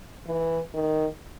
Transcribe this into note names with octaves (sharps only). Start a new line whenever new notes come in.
E3
D#3